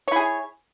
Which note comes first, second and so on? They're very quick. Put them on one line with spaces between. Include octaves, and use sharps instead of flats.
C#5 E4 G#4